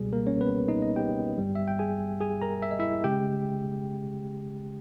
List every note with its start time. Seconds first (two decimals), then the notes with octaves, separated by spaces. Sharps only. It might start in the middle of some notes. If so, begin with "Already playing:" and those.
Already playing: C#2 B2 G3 G#4
0.13 A#3 A#4
0.27 C#4 C#5
0.40 B3 B4
0.68 D#4 D#5
0.82 D#4 D#5
0.96 G4 G5
1.38 G1 G2 G3
1.55 E5
1.68 G5
1.79 G#4 G#5
2.21 G#4 G#5
2.42 A#4 A#5
2.62 E5
2.71 D#5
2.79 E4 E5
3.04 C#3 G#3 G4 G5